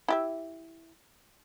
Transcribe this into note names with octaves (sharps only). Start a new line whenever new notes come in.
E4 G4 E5